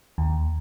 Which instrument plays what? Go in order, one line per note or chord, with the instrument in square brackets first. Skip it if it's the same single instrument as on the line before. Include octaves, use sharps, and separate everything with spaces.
[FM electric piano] D#2